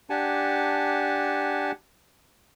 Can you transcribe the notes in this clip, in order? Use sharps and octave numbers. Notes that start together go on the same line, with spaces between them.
D4 G4 F#5 G#5 A5